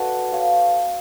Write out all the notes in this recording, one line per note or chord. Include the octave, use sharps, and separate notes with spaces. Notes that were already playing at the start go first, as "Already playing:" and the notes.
Already playing: F#4 A4 B4 D5 F#5
C#5 F5